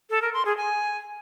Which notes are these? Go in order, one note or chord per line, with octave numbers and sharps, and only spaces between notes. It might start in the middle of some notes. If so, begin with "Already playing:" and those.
A4
A#4
C6
G#4
G#5